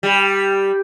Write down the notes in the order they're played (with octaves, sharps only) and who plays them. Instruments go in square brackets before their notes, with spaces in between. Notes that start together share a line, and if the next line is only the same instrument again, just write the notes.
[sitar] G3